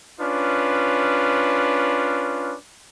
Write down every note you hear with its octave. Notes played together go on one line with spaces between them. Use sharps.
C#4 D4 F4 B4